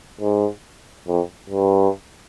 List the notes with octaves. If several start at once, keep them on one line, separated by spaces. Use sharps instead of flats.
G#2
F2
G2